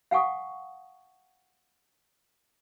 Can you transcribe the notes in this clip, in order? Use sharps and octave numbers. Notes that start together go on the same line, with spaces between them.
F5 F#5 G#5 C#6 D#6